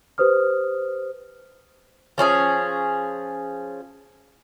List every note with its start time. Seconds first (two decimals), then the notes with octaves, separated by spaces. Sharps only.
0.18 G4 B4 C5 D#6 F6
2.18 F3 C#4 D#4 G#4